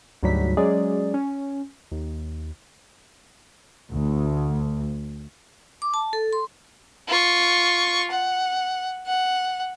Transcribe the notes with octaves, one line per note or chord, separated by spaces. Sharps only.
D2 G#2 F#3 G3 B6
F#3 G#3 C#4 G#4 D5
C#4
D#2
D2
D6
A5
A4
C6
F4 C#6
F#5
F#5